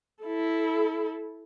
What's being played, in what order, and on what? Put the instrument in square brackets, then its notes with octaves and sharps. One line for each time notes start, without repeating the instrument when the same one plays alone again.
[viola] E4 A4